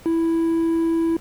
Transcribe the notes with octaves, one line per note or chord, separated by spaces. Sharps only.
E4